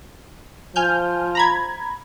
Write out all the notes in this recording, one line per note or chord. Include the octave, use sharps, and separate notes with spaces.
F3 G#5 F6 G6
A#5 B5 G#6